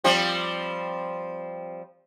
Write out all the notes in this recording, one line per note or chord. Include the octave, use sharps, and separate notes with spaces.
F3 G3 C4